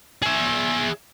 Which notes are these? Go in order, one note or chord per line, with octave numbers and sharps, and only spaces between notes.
G#4 E5